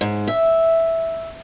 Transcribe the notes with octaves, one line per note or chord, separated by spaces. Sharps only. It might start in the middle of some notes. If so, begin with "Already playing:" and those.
G#2
E5